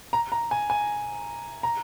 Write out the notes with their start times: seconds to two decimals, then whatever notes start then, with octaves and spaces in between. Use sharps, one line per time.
0.13 A#5
0.32 A#5
0.51 G#5
0.70 G#5
1.63 A#5